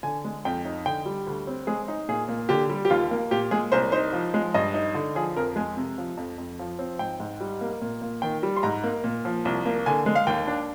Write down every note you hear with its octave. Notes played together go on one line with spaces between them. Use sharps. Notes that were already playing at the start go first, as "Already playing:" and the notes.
D3 G#5
G#3
F2 G5
D#4
D3 G5
G3
D2
C4
G#3 G#4
D#4
A#2 G#4
A#2
D3 G4
G3
G4
D#2 F4
A#3
A#2 G4
G#3 G#4
C2 C5
D#4 C5
F3
G#3
G2 D#5
D#4
D3
F3 G#4
F2 A#4
G#3 G#5
C3
F3
F2
F2
F3
C4
G#2 G5
G#2
G3
A#3
A#2
A#2
D#3 G5
G3
C6
G#2 A#5
A#3
A#2
F3
C2
A#3
D3 G#5
G#3
F5
D#2 G5
D4